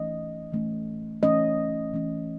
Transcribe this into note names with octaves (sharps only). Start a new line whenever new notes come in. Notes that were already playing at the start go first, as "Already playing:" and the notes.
Already playing: E3 A3 C#4 D#5
E3 A3 C#4
E3 A3 C#4 D#5
E3 A3 C#4